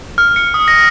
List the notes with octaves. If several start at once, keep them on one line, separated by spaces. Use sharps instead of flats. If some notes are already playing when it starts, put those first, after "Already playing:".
F6
C#7
D#6
A#6